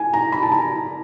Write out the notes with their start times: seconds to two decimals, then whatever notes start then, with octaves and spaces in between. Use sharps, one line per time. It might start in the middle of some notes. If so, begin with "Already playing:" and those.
Already playing: G#5
0.13 A#5
0.32 B5
0.43 A5
0.52 A#5